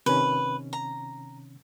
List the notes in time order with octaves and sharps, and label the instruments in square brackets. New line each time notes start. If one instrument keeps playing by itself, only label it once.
[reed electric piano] C3 D#3 C#4 [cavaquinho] B4
[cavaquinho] A#5